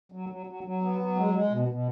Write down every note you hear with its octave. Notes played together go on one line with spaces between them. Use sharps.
F#3
F#3
F#3
F#3
B3
F#3
G#3
G#3
B2
B2